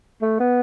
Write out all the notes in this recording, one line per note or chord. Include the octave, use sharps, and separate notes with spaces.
A3
B3